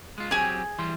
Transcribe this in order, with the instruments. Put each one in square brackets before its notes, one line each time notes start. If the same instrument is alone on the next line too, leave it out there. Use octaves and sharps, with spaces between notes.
[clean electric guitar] G#3 F4
[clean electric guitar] F#3 C4 G4 [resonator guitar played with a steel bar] G#4 G#5
[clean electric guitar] E3 G3 C6